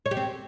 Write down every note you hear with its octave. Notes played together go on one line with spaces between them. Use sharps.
C#5
G4
C4